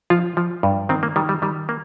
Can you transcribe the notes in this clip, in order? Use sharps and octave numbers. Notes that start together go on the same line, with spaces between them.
F3 F4
F3
G2
D#3 C4
A#3
D#3 G3
G3
D#3 G3
A#3